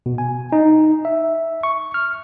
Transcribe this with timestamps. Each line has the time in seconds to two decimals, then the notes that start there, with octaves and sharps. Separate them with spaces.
0.06 B2
0.18 G#5
0.52 D#4
1.05 E5
1.63 C#6
1.94 F6